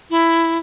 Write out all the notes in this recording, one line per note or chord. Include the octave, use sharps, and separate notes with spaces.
E4